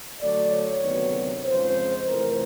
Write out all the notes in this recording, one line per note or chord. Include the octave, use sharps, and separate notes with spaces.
D3 F#3 A3 D5
C#5
D2 C3 D#3 F#3 B3
F2 C#3 F3 G#3 C5
F2 C3 E3 A3 C4 A#4